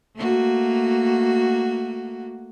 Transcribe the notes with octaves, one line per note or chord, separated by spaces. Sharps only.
A3 A#3 F#4